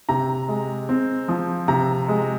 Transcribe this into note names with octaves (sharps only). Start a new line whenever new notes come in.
C3 A#5
G#3
C4
F3
C3 A#5
G#3